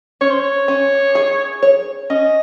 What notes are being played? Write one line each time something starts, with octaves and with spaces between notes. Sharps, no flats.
C#4 C#5
C5
C#5
C#4
G#4
C#5
C#4 D#5